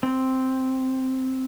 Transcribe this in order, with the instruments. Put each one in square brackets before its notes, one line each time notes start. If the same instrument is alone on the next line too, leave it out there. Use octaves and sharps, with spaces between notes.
[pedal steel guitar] C4